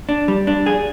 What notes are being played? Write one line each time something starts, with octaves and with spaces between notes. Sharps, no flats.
D4
G3
D4
G#4